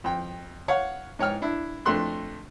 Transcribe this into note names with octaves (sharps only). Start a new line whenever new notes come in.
F2 G5
C#5 F5 F#5 C#6
G#2 C#5 G5 F6
D4 E4
F2 A3 D4 C6 F#6